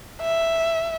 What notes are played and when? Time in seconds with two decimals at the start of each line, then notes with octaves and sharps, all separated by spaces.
0.21 E5